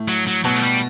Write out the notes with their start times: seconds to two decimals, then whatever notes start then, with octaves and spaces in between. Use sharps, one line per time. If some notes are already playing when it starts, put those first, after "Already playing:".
Already playing: A2
0.08 F#3
0.27 F#3
0.44 B2 F#3
0.56 A3
0.63 G3